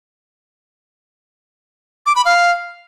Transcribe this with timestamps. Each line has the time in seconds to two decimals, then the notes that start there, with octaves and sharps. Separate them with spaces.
2.06 D6
2.16 B5
2.25 F5